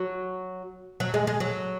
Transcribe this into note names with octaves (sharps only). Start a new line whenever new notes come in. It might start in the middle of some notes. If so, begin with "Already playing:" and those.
Already playing: F#3
F#3
G#3
G#3
F#3